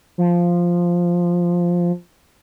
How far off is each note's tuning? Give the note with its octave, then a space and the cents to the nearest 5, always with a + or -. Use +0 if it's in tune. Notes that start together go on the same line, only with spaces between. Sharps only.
F3 +0